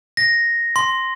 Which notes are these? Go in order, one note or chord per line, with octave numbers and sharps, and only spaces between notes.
A#6
C6